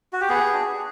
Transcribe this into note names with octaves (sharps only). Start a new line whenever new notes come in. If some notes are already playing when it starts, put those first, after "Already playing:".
F#4
G4
B3 G#4
D4 F#4